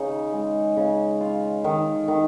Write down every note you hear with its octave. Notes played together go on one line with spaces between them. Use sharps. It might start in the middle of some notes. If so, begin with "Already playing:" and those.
Already playing: C#3 D#4
G#3
C#3
F4
D#3
D#3